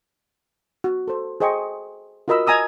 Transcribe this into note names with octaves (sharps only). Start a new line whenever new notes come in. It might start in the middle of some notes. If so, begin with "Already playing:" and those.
F#4
A4 C5
G#4 C5 D#5 G5 C#6
F4 F#4 A#4 D#5 B5 E6
D#5 G#5 A#5 D#6 E6